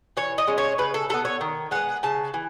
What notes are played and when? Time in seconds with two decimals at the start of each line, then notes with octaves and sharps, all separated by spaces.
0.17 E3 C#5
0.38 D#5
0.47 G#3 C#4
0.58 C#5
0.78 C#3 B4
0.94 A4
1.09 G#3 B3 A4
1.25 C#5
1.41 D#3
1.71 G#3 B3 F#5
2.03 C#3 A5
2.34 E3